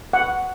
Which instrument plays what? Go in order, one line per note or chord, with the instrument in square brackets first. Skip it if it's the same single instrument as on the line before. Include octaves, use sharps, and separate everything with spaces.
[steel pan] F#5